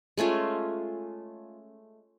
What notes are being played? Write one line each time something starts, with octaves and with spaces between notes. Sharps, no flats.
G#3 A3 C#4 F4